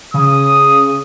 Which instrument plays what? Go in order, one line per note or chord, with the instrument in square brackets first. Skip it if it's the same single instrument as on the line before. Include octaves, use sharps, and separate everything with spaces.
[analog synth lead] C#3 [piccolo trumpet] D#6